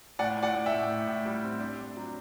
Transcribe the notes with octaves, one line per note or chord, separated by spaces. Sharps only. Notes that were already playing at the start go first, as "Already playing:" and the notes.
A2 D5 F#5
A2
D5 F#5
A2
E5 G5
A2
A2
A2
G3
C4
D4
D4
F#3